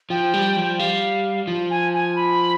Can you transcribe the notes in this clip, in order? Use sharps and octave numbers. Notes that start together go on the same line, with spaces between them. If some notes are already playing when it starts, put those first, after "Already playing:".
F3 G5
G3
F3
G3 F5
F3
G#5
G#5
B5